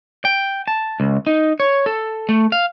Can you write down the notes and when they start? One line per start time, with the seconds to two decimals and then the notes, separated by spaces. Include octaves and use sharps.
0.25 G5
0.68 A5
1.00 C#2
1.27 D#4
1.60 C#5
1.86 A4
2.29 A3
2.52 F5